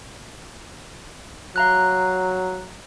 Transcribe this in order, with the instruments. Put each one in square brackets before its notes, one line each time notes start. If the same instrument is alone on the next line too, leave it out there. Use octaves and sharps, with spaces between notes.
[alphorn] F#3 [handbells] F5 A#5 F#6